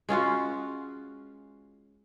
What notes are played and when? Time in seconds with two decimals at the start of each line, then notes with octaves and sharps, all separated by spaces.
0.09 G#3 C#4 F4 F#4